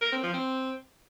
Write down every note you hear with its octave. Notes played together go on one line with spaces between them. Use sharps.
A#4
C4
F3
C4